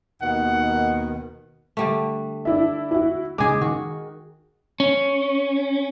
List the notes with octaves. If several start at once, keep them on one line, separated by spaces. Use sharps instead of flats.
D#2 B2 D#3 F#5
D3 G3 A3
D4 E4 E5
E4 F#4
C#3 G#3 G#4 D6
D#3 F#4
C#4